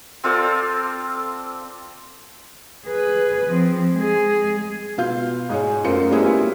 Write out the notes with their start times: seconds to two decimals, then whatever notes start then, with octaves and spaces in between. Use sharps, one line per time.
0.24 C4 F4 A4 D5
2.86 G#4 B4
3.46 F3 C4
3.93 G#3 G#4
4.98 B2 F4 F5 G6
5.49 G#2 G#4 C#5
5.84 F#2 A3 F4 A#4 C5 C#7
6.10 G3 A#3 B3 C#4 E4 G#4
6.25 E4 F4 G4